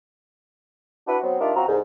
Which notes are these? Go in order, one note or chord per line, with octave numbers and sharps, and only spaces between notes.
D4 E4 F#4 B4
F#3 B3 C4
G3 D4 D#4 F4 A#4 E5
F#2 C4 F4 F#4 A#5
C2 G#2